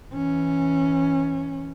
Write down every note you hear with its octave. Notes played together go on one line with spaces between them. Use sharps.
E3 C#4